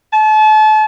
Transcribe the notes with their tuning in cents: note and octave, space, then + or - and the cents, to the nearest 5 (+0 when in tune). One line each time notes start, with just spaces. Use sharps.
A5 -35